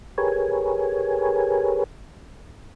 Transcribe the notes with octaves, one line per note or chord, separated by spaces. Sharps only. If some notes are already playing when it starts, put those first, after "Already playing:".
G4 G#4 A#4 B4 C#5 G#5